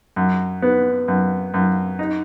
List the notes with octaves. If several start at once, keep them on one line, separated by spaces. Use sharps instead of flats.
F#2
B3
F#2
F#2
D#4